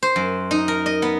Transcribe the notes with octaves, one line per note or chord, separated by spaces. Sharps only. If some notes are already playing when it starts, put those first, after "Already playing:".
C5
F#2
D#4
A#4
D#5
B3